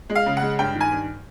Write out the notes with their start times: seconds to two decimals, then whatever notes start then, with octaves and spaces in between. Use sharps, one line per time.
0.10 G#3
0.15 F5
0.26 C#3
0.37 F#5
0.42 G#3
0.59 G2 G5
0.75 D#3
0.81 G#5
0.92 G2